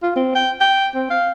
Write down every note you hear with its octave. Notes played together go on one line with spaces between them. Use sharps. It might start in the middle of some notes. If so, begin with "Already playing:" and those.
F4
C4
G5
G5
C4
F5